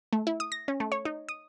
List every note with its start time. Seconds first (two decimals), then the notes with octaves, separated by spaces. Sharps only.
0.13 A3
0.27 E4
0.40 D#6
0.52 A#6
0.68 C#4
0.80 A3
0.92 C#5
1.05 D#4
1.29 D#6